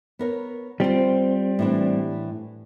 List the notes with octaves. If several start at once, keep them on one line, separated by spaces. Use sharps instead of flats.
B3 A#4 C#5
G3 C4 F4 C5
A2 E3 D4